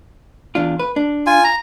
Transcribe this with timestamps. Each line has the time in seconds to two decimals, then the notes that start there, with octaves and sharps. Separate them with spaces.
0.55 E2 D4 F4
0.79 B4
0.96 D4
1.27 F4 G#5
1.44 A#5